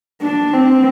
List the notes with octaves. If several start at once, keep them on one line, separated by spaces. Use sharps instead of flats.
D4
C4